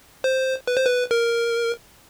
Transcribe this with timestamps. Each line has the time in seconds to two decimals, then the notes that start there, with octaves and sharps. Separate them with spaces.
0.24 C5
0.67 B4
0.77 C5
0.86 B4
1.11 A#4